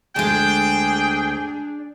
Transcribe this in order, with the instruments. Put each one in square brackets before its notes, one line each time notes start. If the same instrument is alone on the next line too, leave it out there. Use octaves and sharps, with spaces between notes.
[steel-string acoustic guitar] D2 G#3 [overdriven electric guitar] D4 [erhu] G#4 [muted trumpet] G5